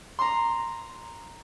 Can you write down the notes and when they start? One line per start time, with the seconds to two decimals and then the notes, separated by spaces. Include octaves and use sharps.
0.19 A#5 C6